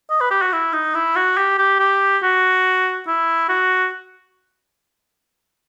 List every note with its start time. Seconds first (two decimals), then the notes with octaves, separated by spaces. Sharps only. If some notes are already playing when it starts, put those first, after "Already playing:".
0.10 D#5
0.20 B4
0.31 G4
0.42 F#4
0.53 E4
0.73 D#4
0.95 E4
1.16 F#4
1.37 G4
1.58 G4
1.79 G4
2.22 F#4
3.07 E4
3.49 F#4